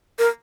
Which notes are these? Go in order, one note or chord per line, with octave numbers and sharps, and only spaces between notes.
A#4